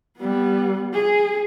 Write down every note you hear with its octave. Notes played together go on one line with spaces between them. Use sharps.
G3 B3
G#4